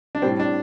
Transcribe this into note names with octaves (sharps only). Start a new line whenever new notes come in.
D4
A2 G3 C4
D4